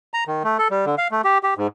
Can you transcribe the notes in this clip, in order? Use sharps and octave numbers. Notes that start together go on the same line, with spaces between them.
A#5
D#3
A3
A4
G3
D3
F5
A3
G4
G4
G#2